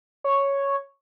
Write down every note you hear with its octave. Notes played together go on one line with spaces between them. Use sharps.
C#5